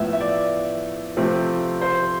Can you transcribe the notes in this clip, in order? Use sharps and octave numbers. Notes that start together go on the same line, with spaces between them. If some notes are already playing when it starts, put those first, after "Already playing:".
Already playing: A2 F3 B3 E5
E5
D5
C3 F3 A3 C4
C5